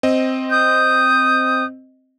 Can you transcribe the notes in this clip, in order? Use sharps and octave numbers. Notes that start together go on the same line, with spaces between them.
C4 D#5
D#6 G6